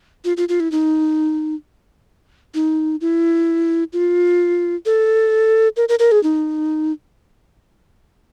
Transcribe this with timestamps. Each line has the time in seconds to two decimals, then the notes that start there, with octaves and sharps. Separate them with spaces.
0.25 F4
0.37 F4
0.49 F4
0.60 E4
0.72 D#4
2.54 D#4
3.01 E4
3.93 F4
4.86 A4
5.77 A#4
5.89 A#4
5.99 A#4
6.12 G#4
6.23 D#4